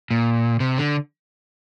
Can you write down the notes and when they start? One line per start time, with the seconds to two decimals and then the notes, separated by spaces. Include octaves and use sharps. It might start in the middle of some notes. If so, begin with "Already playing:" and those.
0.11 A#2
0.60 C3
0.78 D3